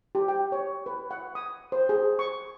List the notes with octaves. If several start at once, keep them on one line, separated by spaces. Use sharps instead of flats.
G4
G5
C#5
B4
F#5
D#6
C5
G#4
C#6